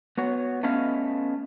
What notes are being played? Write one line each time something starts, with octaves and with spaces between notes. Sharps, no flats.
B3 F#4 C#5
A3 B3 C#4 B4 D#5 F5